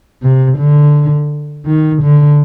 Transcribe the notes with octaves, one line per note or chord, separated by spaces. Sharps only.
C3
D3
D#3
D3